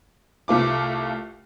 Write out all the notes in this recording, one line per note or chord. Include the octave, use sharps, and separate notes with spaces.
C2 A3 F4 D6